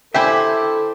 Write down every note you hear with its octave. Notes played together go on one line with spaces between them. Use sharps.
E4 G4 A4 C5 E5 G5 G#5